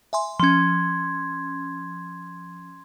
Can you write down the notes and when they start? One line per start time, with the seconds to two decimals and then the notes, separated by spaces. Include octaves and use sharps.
0.13 E5 G#5 C6
0.40 F3 C#4 C6 G#6